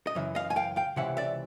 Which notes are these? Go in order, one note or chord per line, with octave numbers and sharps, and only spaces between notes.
D#5
F#2 C#3 E3 E5
D#5 F5
G#5
F5 G5
F5 G5
C#2 C3 E3 E5 F#5
D5 E5